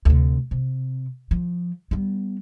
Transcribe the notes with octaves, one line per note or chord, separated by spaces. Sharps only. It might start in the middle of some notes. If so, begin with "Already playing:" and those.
D2 C3
C3
F3
G3 B3